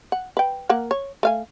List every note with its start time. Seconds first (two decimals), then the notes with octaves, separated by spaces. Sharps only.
0.12 F#5
0.37 B4 G5
0.69 A#3 A#4 F#5
0.91 C#5
1.23 A3 F5 G#5